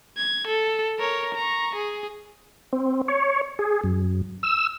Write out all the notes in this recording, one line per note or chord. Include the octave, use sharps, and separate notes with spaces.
G#6
A4
A#4 C#5
A#5 C#6
G#4
C4
C#5
G#4
F#2
E6